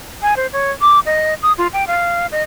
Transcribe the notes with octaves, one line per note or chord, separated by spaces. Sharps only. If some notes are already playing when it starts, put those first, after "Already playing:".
G#5
C5
C#5
D6
D#5
D#6
F4
G5
F5
D#5